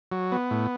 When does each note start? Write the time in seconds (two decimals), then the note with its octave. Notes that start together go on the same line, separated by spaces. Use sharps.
0.12 F#3
0.32 B3
0.51 A2